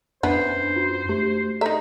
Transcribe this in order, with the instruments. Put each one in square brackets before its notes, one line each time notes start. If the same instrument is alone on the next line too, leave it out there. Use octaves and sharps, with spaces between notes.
[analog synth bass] F#2 [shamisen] B3 E4 [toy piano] D4 [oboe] C5
[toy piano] F4 F#4
[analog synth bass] A3 [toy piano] G4 C6
[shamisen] D#4 E5 [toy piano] A4 A#5